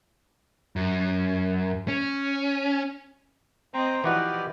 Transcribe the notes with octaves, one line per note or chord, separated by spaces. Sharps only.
F#2
C#4
C4 C5 D#5 G5 A#5
E3 F3 D#4 E4 F#4 G4 D5 F#5